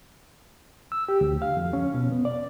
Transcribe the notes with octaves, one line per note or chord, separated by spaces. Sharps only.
E6
G4
D2
F5
F2
C#4
B2
B3
D5